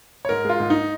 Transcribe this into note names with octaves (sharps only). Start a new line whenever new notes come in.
C#5
G#2 A#4
G#3 F4
G#2
D#4